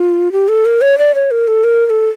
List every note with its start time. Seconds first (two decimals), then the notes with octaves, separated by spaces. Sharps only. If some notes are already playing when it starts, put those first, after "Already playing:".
Already playing: F4
0.32 G4
0.48 A4
0.65 A#4
0.81 C#5
0.98 D5
1.15 C#5
1.31 A#4
1.47 A4
1.64 A#4
1.86 A#4
1.90 A4